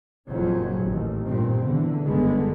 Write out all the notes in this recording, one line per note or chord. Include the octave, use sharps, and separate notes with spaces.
F#1 F2 A#2 F#3 C#4
A1 D#2
G2 A#2 C4
E2 D3 E3
G1 F#2 D3 D#3 G#3 B3